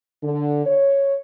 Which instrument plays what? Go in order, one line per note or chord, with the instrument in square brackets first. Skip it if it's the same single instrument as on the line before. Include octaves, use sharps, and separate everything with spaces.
[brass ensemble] D3
C#5